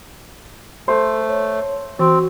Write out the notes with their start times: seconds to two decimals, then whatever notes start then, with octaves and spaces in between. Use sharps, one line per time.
0.88 A3 A4 C5 C6
1.28 C#5
1.99 E3 C4 F#4